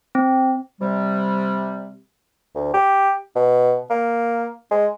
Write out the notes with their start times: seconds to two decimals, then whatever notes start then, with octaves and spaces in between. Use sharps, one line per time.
0.15 C4
0.81 C3 G3
2.55 D2
2.74 G4
3.35 B2
3.90 A#3
4.71 G#3